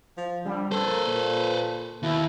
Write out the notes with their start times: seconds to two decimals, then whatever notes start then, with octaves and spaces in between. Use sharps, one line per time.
0.17 F3
0.45 D3 G3
0.71 F2 A4 B4 C5
0.87 A#3
1.07 A#2
2.03 D#2 B2 E4